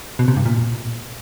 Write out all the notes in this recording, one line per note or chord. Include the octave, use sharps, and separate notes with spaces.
B2
C3
G2
A#2